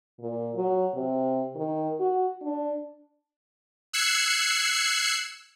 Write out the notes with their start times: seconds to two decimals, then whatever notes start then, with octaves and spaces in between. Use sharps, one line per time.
0.19 A#2
0.55 F#3
0.94 C3
1.55 D#3
2.00 F#4
2.42 D4
3.93 E6 F#6 G#6 C7 C#7